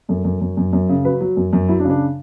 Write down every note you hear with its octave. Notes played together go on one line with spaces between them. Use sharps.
F#2 A4
F#2
F#2
F#2
F#2
C#3
F#3 B4
F#3
F#2
F#2
F#3 E4
D4
C#3
D4